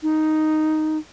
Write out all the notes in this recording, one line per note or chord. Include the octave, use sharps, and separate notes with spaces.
D#4